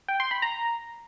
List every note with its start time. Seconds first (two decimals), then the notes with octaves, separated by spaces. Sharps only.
0.09 G5
0.20 C6
0.31 B5
0.42 A#5